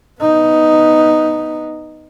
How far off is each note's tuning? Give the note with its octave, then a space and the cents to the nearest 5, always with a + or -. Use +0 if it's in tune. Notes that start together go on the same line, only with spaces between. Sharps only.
B3 +0 D#4 +0